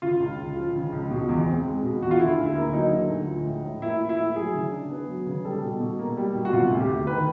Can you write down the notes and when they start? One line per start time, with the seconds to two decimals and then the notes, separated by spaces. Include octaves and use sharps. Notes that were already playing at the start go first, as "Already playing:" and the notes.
0.02 C#3 F4
0.20 C#2
0.38 C#2
0.56 F3
0.75 C#3
0.92 C#2
1.11 B2
1.29 E2
1.46 C4
1.65 G#3
1.83 B2
2.00 E2 F#4
2.11 F4
2.19 D3 E4
2.38 D2
2.46 E4
2.56 A#3
2.73 F#3 D#4
2.92 D3
3.09 D2
3.27 F3
3.46 A2
3.64 A2
3.82 A#3 E4
4.00 F3
4.09 E4
4.18 A2
4.36 F#3 G#4
4.55 C#3
4.72 D4
4.90 B3
5.09 F#3
5.26 C#3
5.45 G3 A4
5.63 B2
5.80 B2
5.99 A#3
6.17 G3
6.35 B2
6.45 F#4
6.53 C3 F4
6.71 D2
6.80 G4
6.89 D2
7.07 D#3 B4